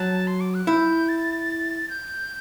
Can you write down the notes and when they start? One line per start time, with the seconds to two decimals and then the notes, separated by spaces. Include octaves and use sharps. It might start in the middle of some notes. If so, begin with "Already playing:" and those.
Already playing: F#3 A5
0.27 C6
0.40 D6
0.54 F#6
0.67 E4 G6
1.09 A6
1.90 G6